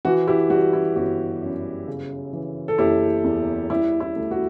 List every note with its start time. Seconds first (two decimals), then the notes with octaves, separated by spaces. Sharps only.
0.05 E3 F#4
0.27 E4 G4
0.50 G3 F#4
0.73 E4
0.96 G1 F#4
1.42 F#2
1.87 C#3
2.33 E3
2.68 A4
2.78 F#1 E4 G4
3.24 E2
3.70 G3 E4 G4
4.00 E4
4.16 D2
4.31 F#4